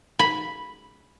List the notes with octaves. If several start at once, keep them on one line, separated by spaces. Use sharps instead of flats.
B5